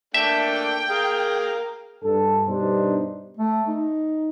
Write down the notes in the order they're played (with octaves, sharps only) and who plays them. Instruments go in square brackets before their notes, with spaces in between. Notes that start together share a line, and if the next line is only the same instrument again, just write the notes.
[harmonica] A3 A#3 D4 [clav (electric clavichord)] E5 [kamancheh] G5
[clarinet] G#4 [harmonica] A#4 F5
[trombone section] G2 A4
G2 B2 G3 D4 D#4 C5
[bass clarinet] A3
D#4